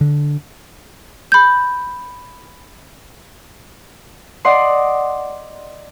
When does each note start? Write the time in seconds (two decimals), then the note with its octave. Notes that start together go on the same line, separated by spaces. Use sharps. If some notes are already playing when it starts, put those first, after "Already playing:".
0.01 D3
1.32 B5 G6
4.45 D5 D#5 F#5 C6